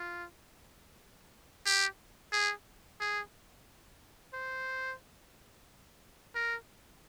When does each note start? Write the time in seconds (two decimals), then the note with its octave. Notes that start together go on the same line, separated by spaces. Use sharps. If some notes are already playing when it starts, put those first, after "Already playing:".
Already playing: F4
1.66 G4
2.33 G#4
3.00 G#4
4.34 C5
6.35 A#4